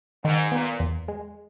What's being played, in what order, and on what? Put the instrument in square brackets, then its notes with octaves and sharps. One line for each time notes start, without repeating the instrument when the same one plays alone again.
[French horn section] G#2 [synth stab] D#3
[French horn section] A#2 [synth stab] B3
[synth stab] E2
G#3